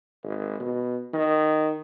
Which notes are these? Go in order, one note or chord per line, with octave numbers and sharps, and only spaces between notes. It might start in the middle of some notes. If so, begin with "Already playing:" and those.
G#1
B2
D#3